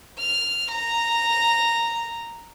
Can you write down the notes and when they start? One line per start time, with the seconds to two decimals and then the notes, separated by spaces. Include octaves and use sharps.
0.19 F6
0.71 A#5